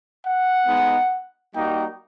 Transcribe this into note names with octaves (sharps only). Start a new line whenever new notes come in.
F#5
G#3 B3 D#4
G3 A#3 D#4 F#4 G5